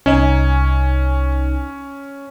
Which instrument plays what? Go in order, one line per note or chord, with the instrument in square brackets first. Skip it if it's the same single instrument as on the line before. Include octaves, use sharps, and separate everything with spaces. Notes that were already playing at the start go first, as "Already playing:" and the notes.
[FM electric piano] C2 D#4 G#5 [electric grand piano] C#4